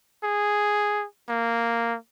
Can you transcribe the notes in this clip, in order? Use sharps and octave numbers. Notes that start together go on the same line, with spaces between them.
G#4
A#3